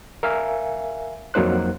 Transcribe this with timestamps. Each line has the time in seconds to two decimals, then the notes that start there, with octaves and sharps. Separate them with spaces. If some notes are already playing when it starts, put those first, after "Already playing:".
0.23 A#4 E5 F5 G#5
1.34 F2 F#3 A#3 D#4 C5 F#6